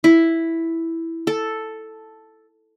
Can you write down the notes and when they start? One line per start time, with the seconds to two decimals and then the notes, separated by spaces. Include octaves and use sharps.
0.04 E4
1.27 A4